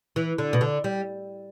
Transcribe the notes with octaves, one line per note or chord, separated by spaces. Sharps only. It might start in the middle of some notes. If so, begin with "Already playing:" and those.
E3
D3
B2
D3
G3